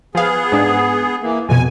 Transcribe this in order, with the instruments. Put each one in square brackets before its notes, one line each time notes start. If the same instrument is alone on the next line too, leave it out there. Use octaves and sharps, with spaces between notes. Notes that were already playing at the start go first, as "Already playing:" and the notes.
[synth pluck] F3 F5 [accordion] B3 G#4
[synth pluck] G#2 D4
[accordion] E3 A#3
[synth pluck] F2 B2 [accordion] G#5